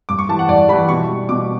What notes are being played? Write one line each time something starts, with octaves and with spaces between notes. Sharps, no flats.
G2 D6
C#6
E3 G3 A5
F#5
G2 D5
E3 G3 B5
B2 C#6
G3
B2 D6